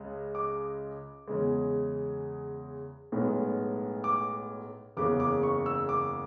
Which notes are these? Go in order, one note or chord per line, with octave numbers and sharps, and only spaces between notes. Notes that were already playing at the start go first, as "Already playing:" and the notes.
Already playing: C#2 C#3 G#3
D6
E2 C#3 G#3
B1 A2 G#3 B3
D6
F#1 E2 C#3 D6
D6
C#6
E6
D6